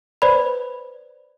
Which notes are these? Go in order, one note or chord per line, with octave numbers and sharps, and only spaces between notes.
B4 C5 D5 B5